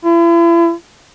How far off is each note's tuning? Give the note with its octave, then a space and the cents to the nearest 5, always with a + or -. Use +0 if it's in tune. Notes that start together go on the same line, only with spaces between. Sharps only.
E4 +40